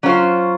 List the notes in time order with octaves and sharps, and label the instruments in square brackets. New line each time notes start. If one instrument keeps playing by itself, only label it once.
[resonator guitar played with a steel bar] F#3 C#4 F4 C5